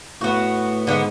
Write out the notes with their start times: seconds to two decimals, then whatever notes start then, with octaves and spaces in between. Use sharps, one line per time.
0.21 A2 B3 F#4
0.87 G#2 D3 B3